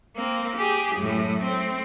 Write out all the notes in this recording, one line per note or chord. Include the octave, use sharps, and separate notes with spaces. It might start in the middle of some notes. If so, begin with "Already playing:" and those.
A#3 C4
G4 G#4
F#2 A2
A3 C4